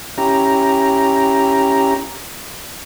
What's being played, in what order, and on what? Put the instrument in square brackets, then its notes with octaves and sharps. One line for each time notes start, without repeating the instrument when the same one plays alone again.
[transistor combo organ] C#4 E4 G4 A#5